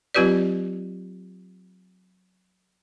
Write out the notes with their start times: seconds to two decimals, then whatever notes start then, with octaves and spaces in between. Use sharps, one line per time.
0.15 F#3 C4 F4 G4 B4 D5